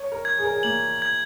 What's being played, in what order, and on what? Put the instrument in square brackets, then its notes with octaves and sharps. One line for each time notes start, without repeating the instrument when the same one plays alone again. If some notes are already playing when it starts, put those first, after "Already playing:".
Already playing: [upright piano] C#5
A#4
[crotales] G#6
[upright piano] G#4
A#4
G#4
[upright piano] A#3 [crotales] F#7
[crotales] G#6